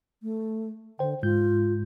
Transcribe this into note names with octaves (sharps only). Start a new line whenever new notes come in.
A3
D3 C5 G5
G#2 G#3 F4 G6